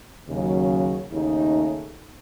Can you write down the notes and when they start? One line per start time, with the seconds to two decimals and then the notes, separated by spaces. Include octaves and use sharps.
0.28 D#2 C#3 F#3
1.12 D#2 C#3 A3 D#4